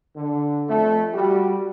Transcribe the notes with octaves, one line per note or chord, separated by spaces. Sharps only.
D3
F2 A3
G3 F#4 G4